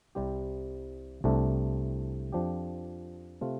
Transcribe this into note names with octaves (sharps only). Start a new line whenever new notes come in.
C2 C3 G3 C4 G4
C2 C3 A3 D4
F2 F3 D4 G4
C3 A3 F4